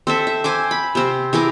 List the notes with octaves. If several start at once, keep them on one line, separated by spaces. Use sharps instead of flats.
C4 A4 E5
E5
C5 G#5 D6
B5
C3 C4
E3 G#4 A#4 D6